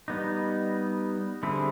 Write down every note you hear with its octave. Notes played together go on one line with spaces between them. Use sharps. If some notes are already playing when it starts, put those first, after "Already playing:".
G3 B3 D#4
D3 G3 C4 E4 G#4